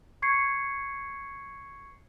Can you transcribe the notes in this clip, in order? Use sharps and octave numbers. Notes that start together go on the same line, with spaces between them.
C#6 G#6 C7 C#7